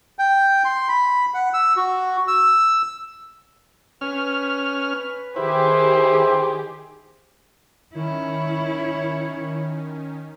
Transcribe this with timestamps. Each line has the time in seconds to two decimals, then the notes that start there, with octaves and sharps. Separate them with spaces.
0.19 G5
0.65 C6
0.89 B5
1.34 F#5
1.54 E6
1.77 F#4
2.28 E6
4.01 C#4 B4 F6
5.36 D#3 E4 G4 G#4 C5
7.95 D#3 C#4 E4 C#5